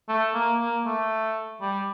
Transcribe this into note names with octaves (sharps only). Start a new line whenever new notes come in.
A3
A#3
A#3
A3
G3